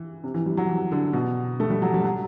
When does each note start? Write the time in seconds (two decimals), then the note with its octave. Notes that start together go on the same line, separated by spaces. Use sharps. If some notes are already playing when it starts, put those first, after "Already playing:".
Already playing: E3
0.24 C3
0.34 E3
0.46 G3
0.57 F#3
0.69 E3
0.92 D3
1.13 B2
1.60 A3
1.70 G3
1.82 F#3
1.94 G3
2.04 F#3